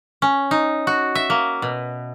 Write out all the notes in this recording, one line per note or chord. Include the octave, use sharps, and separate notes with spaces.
C#4
D#4
F#4
E5
A#3
B2